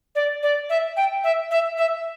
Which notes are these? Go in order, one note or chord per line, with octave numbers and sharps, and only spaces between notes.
D5
D5
E5
G5
E5
E5
E5